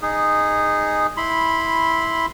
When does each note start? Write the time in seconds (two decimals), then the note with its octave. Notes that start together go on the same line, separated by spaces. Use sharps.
0.02 D#4 G#4
1.17 E4 B5 C6